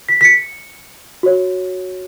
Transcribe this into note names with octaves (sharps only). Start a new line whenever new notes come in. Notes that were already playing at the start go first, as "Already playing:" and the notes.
B6
B6
C#7
F#4 C#5